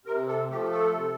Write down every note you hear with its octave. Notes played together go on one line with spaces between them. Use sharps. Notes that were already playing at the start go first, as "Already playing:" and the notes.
C3 A#4
A4
F3 A3 G4
A4
C3